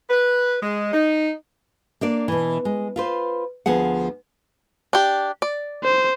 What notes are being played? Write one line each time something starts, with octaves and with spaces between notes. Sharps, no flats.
B4
G#3
D#4
A#3 D4 D5
B2 E3
G#3
F4 B4 C5
D2 F3 B3 G#4 F#5
D4 G4
D5
C5